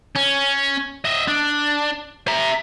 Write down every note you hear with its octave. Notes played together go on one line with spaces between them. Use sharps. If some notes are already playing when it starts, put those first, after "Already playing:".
C#4
D#5 E5
D4
E5 A#5